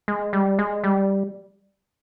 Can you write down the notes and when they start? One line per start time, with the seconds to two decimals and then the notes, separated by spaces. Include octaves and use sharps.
0.08 G#3
0.33 G3
0.59 G#3
0.84 G3